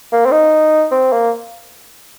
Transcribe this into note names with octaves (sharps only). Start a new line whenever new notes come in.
A#3
C4
D#4
C4
A#3